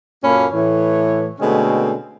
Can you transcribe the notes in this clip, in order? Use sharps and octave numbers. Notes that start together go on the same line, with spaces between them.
F#2 A#2 A#3 C#4 A4 B5
A2 E3 C#5
B2 D3 G#3 A3 C4 C#4